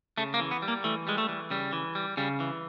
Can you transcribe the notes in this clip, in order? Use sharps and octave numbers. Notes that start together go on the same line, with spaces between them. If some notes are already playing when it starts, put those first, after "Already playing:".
C#3 A3
A#3
E3
B3
G3
A#3
E3 A3
G3 G#3
A3
E3
C#3 G3
E3
G3
C#3 G3
E3